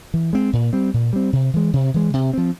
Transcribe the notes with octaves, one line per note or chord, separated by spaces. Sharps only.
E3
G#3 C4
A#2
G3 C4
A#2
G3 C4
C3
E3 G#3
C3
E3 G#3
C3
F3 C4